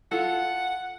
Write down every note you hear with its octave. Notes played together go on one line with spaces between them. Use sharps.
F4 A4 F#5